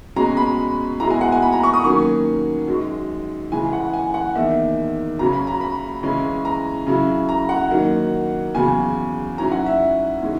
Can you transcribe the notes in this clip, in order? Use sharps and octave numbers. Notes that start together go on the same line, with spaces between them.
B2 G#3 C#4 A#5
B5
B2 G#3 B3 E4 A#5
G#5
F#5
G#5
B5
A#5
C#6
D#6
D#3 F#3 A#3 C#4 C#6
F#2 D#3 G#3
C#3 E3 G#3 G#5
F#5
G#5
F#5
E2 D#3 A#3 D#4 E5
F#2 C#3 F#3 C#4 A#5
B5
A#5
B5
C#3 E3 G#3 C#4 E4
A#5
C#3 F#3 C#4 E4
A#5
F#5
F#2 D#3 F#3 A#3 D#4
E2 C#3 F#3 G#5
G#2 F#3 C#4 E4 A#5
F#5
E5
D#3 G#3 C#4 E4